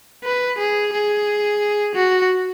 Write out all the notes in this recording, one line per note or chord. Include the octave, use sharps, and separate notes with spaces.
B4
G#4
G#4
F#4